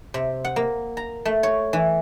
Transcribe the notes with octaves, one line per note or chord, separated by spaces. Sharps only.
C3
F#5
A#3
A#5
A3
C#5
E3